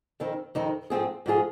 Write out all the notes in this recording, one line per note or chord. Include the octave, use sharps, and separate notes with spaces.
F2 D#3 C4 D#4
F2 D#3 C4 D#4
G#2 F3 C4 F4 G#4
G#2 F3 C4 F4 G#4